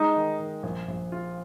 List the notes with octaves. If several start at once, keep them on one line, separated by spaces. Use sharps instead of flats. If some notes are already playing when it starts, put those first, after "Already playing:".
Already playing: G#3 D#4
D#3
D#3
A#1
A#1
F4